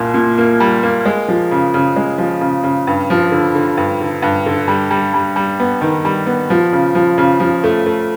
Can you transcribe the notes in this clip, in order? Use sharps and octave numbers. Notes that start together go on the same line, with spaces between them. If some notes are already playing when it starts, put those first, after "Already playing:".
Already playing: C2 A#2 A#3
A#2
A#3
G3
A#3
G#3
F3
C#3
C#3
G#3
F3
C#3
C#3
G2
F3
D3
D3
G2
D3
G2
D3
G3
G3
G3
G3
B3
D#3
G3
B3
F3
C#3
F3
C#3
F3
A3
A3